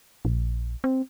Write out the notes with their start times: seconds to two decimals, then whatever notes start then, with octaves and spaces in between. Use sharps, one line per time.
0.25 A#1
0.84 C4